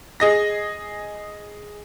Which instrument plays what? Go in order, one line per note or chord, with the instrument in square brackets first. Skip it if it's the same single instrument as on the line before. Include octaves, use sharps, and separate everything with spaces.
[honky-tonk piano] G#4 D#5 A#6